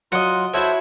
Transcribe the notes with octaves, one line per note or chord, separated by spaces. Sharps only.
F#3 F4 D#5 F#5
E4 F#4 A4 C5 C#5 E5